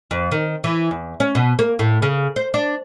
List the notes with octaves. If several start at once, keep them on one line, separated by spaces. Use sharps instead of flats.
F2
D#3
E3
E2
C#4
B2
A#3
A2
C#3
C5
D4